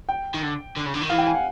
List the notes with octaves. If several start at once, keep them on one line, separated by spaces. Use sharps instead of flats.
G5
D#3
D3
D3
C#3
D3
D#3
E3 F5
G5
G#5
F#5